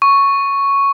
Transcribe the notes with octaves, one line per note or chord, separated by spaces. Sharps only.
C#6